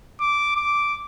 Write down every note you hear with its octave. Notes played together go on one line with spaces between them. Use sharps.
D6
D6